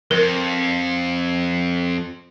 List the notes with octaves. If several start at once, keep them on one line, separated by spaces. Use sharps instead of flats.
F2 A#4